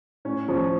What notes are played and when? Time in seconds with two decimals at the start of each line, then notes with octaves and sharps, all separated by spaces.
0.25 A2 C#4
0.48 F3 C#4